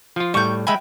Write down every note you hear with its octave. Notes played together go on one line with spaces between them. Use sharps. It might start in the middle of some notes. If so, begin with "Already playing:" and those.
F3 F4
A2 G3 C#6 G6
G#3 E5 G5 G#5 B5